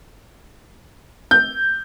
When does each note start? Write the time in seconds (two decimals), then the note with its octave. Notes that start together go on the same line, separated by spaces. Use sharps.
1.31 G6